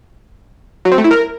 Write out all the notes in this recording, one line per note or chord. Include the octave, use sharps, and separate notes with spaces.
F#3
C4
A3
E4
A#4